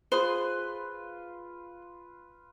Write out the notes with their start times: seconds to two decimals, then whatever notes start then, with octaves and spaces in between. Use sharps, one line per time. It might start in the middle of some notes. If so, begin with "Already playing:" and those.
0.12 F4 G#4 B4 C5